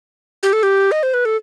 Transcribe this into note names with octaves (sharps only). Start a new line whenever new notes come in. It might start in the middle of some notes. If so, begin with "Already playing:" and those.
G4
A4
G4
D#5
C5
B4
A4